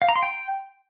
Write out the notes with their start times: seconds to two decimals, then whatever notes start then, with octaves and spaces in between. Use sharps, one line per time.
0.02 F5
0.09 A#5
0.16 C6
0.23 G5